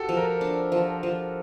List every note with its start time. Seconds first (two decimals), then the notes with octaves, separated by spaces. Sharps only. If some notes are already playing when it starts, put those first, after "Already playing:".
Already playing: F#4 G4 A4
0.09 F3
0.17 A#4
0.41 D4
0.72 F3
1.03 F3